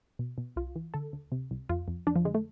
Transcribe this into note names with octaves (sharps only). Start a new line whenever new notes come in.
B2
B2
C2 F4
E3
D3 A4
D2
C3
C2
F2 F4
F2
F2 D4
F3
D3 G#3
A3